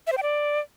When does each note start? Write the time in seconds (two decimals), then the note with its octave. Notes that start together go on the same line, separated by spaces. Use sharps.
0.07 E5
0.12 C5
0.17 G5
0.23 D5